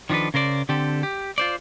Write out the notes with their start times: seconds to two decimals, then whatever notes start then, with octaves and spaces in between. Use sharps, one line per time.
0.10 D#3 F3 D4 A4 B4
0.34 C#3 A#4 C5 D5
0.69 D3 C4 G4 A4
1.03 G4
1.38 F4 C5 D5